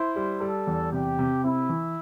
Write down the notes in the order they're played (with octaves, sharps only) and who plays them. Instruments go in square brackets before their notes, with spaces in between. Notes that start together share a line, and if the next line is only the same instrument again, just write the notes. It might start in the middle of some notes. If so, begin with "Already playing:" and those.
Already playing: [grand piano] E4 [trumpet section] C5
[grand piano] G3
[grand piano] G3 [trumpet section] A4
[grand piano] E2
[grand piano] C3 [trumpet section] G4
[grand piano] C3
[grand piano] C4 [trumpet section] E4
[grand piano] E3